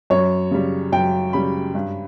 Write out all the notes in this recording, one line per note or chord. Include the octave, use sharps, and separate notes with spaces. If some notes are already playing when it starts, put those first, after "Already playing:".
F#2 C#5
C#3 G3
F#2 G5
C#3 G3 B5
G2